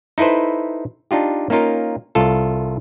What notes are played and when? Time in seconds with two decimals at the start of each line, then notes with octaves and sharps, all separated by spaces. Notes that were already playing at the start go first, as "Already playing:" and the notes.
0.18 D#4 E4 A4 B4 C5
1.11 D4 D#4 F4 G4
1.50 A#3 C#4 D#4 F4 A#4
2.15 C2 F4 A4